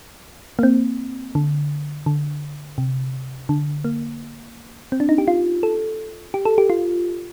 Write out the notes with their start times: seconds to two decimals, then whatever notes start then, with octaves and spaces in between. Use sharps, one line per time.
0.59 A#3
0.63 C4
1.35 D3
2.06 D3
2.78 C3
3.49 D3
3.84 A#3
4.92 C4
5.00 D4
5.09 D#4
5.18 G4
5.28 F4
5.63 A4
6.34 G4
6.45 A4
6.58 G4
6.70 F4